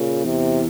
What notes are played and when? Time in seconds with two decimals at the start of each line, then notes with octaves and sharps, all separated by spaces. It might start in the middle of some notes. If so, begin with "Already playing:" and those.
Already playing: A#2 C#3
0.25 E2 C3